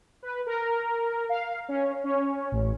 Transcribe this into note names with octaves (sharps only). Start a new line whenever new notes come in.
B4
A#4
F5
C#4
C#4
A1